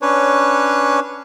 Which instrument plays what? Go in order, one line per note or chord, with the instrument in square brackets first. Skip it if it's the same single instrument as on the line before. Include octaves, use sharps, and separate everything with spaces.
[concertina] C#4 D4 B4 C#5